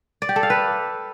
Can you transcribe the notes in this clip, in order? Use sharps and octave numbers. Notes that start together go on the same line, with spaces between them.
D5
G4
A4
F5
B4